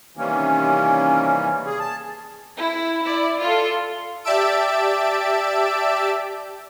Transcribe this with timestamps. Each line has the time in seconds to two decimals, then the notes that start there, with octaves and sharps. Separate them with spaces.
0.17 C3 D#3 E3 G3 A#3 C#4
1.66 G#4
1.79 A5
2.56 E4
3.03 E4 D5
3.41 F4 A4
4.24 G4 D5 E5 A5 E6 D7